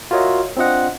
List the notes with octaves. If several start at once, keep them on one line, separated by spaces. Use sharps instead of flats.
F4 F#4 A#4 C#5 D#5 E5
C4 D4 F4 D#5 F#5